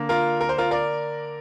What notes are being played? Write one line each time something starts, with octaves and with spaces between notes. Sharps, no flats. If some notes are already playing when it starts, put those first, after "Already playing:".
Already playing: D3 A#3
F4 A#4
A#4
C5
F4 A#4
A#4 D5